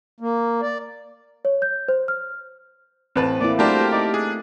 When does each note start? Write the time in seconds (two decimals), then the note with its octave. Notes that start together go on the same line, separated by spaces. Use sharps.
0.20 A#3
0.62 D5
1.45 C#5
1.62 G6
1.88 C5
2.08 F6
3.16 A1 C4 B4 A5
3.41 A#3 E4 D5
3.59 F#3 G3 A3 D4 G4 A#4 C5 A5
3.92 D#4 D5
4.14 D4 G#4